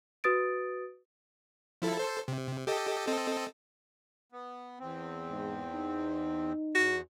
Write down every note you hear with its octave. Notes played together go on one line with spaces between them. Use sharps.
F#4 B4 D#6 A6 D7
F3 E4 A4
A4 C5
C3
G4 A4 D#5
C4 A4 D#5
B3
E2 C4
G#2
D#4
E2 F#4